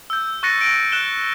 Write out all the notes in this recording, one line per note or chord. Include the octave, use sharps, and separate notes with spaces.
E6 G6
C#6 F#6 A6 A#6 C#7 D#7
A#6 D7
F#6 E7 G7